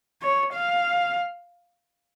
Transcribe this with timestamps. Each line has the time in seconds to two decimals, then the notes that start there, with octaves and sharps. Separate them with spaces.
0.22 C#5
0.53 F5